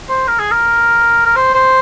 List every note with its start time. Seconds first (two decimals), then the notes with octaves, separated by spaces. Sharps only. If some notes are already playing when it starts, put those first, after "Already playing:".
0.09 C5
0.27 A#4
0.39 G#4
0.52 A#4
1.26 A#4
1.36 C5
1.54 C5